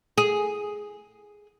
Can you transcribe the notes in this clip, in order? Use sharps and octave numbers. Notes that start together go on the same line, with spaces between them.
G#4